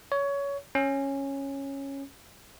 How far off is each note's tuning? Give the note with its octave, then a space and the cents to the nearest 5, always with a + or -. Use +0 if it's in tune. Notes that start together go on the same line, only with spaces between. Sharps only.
C#5 +20
C#4 -10